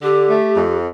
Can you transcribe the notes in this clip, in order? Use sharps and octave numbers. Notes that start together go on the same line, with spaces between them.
D3 G4
A3
F2